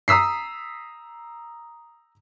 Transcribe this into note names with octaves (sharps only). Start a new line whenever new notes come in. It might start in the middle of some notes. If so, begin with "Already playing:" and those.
A#5 D#6 E6 B6 C7